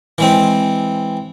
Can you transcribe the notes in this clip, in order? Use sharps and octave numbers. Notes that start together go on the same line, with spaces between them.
E3 G#3 C4